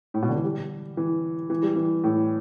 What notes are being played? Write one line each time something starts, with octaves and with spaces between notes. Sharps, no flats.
A2
B2
D3
E3
G3
E3
E3
G3
E3
A2